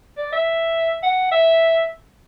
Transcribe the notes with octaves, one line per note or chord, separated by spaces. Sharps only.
D5
E5
F#5
E5